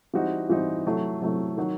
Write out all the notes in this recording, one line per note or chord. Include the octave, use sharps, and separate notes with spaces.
E3 G3 C4 D#4 F#4
E3 G3 C4 D#4 F#4
C3 F#3 A3 E4
C3 F#3 A3 E4
D#3 F#3